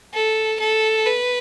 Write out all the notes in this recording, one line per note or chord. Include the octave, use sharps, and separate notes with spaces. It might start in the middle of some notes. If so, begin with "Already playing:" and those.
A4
A4
B4